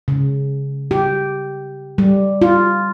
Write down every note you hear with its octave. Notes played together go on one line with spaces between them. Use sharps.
C#3
G4
G3
F4